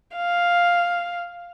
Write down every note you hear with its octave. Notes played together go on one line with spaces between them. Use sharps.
F5